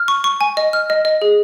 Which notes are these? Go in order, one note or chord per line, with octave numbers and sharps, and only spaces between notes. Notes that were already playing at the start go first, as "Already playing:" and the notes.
Already playing: F6
C#6
C#6
G#5
D#5
F6
D#5
D#5
G#4